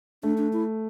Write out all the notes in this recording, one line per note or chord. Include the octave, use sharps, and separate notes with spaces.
A3 D4
D4
E4